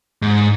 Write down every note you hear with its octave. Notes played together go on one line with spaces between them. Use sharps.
G#2